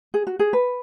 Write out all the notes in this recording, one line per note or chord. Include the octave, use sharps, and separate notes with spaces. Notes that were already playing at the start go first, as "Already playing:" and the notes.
G#4
F#4
G#4
B4